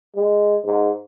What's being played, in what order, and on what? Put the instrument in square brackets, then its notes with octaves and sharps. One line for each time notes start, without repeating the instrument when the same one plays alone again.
[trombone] G#3
G#2